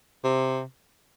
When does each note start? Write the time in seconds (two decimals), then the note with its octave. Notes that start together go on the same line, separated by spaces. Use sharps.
0.24 C3